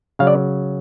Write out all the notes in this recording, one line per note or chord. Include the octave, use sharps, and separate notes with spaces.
C#3 F#3 F5
D5